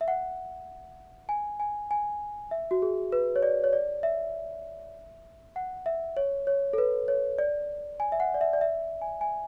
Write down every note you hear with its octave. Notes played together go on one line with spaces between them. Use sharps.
E5
F#5
G#5
G#5
G#5
E5
F#4
G#4
B4
C#5
D5
C#5
D5
E5
F#5
E5
C#5
C#5
A4
B4
C#5
D5
G#5
E5
F#5
D5
E5
D5
E5
G#5
G#5